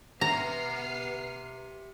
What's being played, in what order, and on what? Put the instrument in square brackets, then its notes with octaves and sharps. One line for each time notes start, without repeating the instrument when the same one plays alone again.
[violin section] B3 F6 C7 [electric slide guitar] G4 E5 [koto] A#5